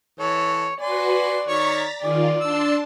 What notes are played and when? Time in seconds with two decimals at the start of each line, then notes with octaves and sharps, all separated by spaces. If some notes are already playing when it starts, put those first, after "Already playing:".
0.20 E3 A4 C#5
0.81 F#4 B4 D5 G#5 C6
1.48 D#3 C#5 A#5 C#6 A6 B6
2.01 D#3 F4 G#4 D5
2.41 D4 A5 C6 E6